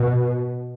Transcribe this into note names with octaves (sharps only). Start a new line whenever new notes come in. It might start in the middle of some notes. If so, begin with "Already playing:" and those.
Already playing: B2